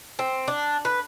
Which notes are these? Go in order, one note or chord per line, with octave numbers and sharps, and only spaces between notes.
C4
D4
B4